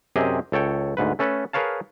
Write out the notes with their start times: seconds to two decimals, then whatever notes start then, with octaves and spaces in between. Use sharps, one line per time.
0.16 F#2 C3 C4 G4 G#4 D#5
0.52 C#2 A4 C#5 G5
0.97 D2 G#2 B4
1.19 A3 C#4 A4 B4
1.53 G#4 A#4 B4 C#5 F5 A5